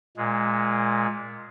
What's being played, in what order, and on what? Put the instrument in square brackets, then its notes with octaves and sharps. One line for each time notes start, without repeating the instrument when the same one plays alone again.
[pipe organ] A#2 G#3